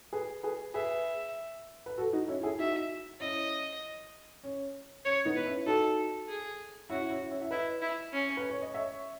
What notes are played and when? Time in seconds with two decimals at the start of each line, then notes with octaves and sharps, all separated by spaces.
0.13 G#4 B4
0.43 G#4 B4
0.74 G#4 B4 E5
1.86 B4
1.98 F#4 A4
2.13 D#4 F#4
2.28 C#4 E4
2.43 E4 G#4
2.59 D#4 F#4 E5
3.20 C#4 E4 D#5
4.43 C#4
5.05 C#4 C#5
5.25 B3 D#4
5.36 B4
5.45 C#4 E4
5.66 D#4 F#4 A4
6.29 G#4
6.90 C#4 E4 F#4
7.10 C#4 E4
7.31 C#4 E4
7.42 E5
7.51 E4 B4 D#5
7.82 E4
8.13 C#4
8.37 B4
8.50 C#5
8.62 D#5
8.74 C#5 E5